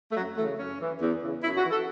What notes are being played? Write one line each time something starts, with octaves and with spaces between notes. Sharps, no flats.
A3
F#2 F#3
C#3 E3 A3
F#2 C#4
E3
E2
C#3 E3
F#2 E4
F#4
E3
A4